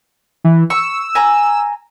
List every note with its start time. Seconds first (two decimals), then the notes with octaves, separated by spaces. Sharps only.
0.44 E3
0.70 C#6 E6
1.15 G#5 A#5